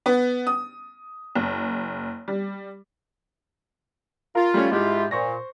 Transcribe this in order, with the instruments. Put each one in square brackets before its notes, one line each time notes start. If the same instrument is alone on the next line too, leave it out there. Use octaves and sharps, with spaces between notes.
[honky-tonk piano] B3
D#6
F#1
G3
[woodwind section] F4 [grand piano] A#4
[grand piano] G3 A3 C#4
[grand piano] G#2 G#3 [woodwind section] E4 F4 G4
[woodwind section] A#2 [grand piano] C5 C#6 A#6